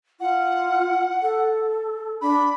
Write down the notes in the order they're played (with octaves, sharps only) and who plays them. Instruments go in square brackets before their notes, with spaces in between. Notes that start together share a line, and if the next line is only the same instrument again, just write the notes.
[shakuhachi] F4 [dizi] F#5
[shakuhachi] A4
[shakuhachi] D4 [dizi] B5